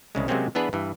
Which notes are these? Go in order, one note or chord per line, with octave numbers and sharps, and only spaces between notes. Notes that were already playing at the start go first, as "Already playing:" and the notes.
C2 C#3 G#3
C3 F#3 G#3 A#3 C4 C#4
E3 B3 D4 G#4 B4
G2 E3